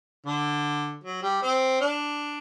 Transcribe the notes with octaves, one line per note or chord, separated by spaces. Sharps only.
D3
F#3
G3
C4
D4